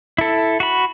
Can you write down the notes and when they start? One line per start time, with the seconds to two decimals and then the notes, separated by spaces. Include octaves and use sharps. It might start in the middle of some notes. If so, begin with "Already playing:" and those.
0.18 E4 A4
0.60 F#4 B5